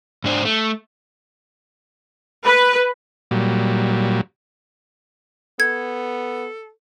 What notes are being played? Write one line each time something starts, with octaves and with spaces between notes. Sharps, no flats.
G#2 D4 C5
A3
B4
A#2 F#3 G3
B3 A4 G#6